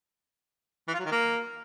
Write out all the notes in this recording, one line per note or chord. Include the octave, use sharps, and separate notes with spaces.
E3
F4
F#3
D#3
A#3